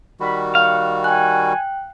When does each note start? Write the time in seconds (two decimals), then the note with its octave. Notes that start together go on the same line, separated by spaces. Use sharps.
0.20 D#3 G3 F#4 B5
0.55 F5 F#5
1.04 G5 G#5 F#6